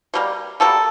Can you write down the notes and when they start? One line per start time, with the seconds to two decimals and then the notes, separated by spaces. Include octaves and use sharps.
0.14 B2 G3 A#3
0.60 B2 G3 A#3 A4